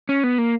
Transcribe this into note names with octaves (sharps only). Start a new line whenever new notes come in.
C#4
B3
A#3